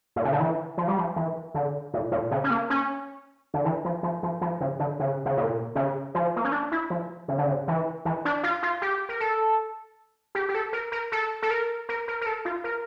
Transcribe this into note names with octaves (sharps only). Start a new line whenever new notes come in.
A#2
C#3
D3
E3
F3
G3
F3
E3
D3
A#2
A#2
C#3
C#4
A#3
C#4
D3
E3
F3
F3
F3
F3
C#3
D3
C#3
C#3
A#2
C#3
F3
A#3
C#4
D4
E4
F3
C#3
D3
C#3
E3
E3
D4
F4
F4
G4
A#4
A4
G4
G4
A4
A#4
A#4
A4
A4
A#4
A#4
A#4
A#4
A4
F4
A#4